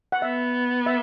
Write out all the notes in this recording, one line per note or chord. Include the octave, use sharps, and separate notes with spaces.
F#5
B3 E5
E5